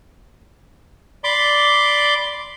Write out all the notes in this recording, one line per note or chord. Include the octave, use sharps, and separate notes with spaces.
D5 B5 C6 D6